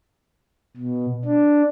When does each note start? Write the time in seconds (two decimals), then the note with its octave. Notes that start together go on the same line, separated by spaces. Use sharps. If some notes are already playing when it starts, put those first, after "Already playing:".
0.76 B2
1.25 D4